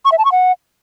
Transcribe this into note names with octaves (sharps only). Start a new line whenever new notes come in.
C#6
E5
A5
C#6
F#5